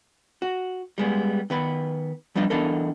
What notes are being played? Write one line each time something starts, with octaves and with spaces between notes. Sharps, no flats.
F#4
G3 G#3 B3
D#3 B3 B4
F3 G3 B3 D4 D#4
E3 B3 D4 D#4 A4 A#4